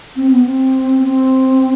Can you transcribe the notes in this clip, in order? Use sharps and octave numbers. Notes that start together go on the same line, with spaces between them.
C4
B3
C4
C4